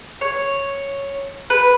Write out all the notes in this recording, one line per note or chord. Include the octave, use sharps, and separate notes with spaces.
C#5
B4